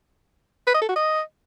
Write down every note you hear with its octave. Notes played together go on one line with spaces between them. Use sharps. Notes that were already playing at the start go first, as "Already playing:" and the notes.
B4
D#5
A4
F#4
D#5